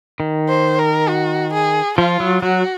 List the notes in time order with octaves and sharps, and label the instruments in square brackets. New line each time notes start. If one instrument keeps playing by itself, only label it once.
[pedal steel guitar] D#3
[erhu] C5
A#4
F#4
G#4
[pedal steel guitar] F3 [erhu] F4
[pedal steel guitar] F#3
[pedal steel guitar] F#3 [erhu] F#4